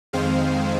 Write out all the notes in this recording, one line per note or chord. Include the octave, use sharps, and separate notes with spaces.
F2 D#3 G#3 C4 C5 F5